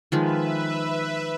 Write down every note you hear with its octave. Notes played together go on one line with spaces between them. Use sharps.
D#3 F3 G#3 B4 E5